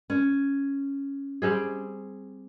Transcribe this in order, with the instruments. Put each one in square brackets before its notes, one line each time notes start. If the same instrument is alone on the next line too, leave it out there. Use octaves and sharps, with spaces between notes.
[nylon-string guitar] C#4
[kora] G3 C4 G#4